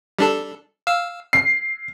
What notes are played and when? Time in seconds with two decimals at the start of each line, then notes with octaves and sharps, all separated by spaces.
0.19 G3 D4 A4
0.87 F5 E6
1.33 C7